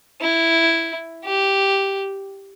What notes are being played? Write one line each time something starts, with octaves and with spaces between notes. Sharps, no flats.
E4
G4